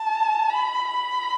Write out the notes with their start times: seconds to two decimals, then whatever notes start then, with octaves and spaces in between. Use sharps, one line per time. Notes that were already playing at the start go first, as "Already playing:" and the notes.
Already playing: A5
0.51 B5
0.88 B5